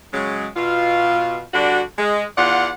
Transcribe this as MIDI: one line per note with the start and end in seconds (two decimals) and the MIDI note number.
0.13 0.48 49
0.13 0.48 54
0.13 0.48 56
0.56 1.43 47
0.56 1.43 65
1.54 1.82 50
1.54 1.82 55
1.54 1.82 62
1.54 1.82 66
1.98 2.24 56
2.37 2.70 40
2.37 2.70 65
2.37 2.70 74
2.37 2.70 78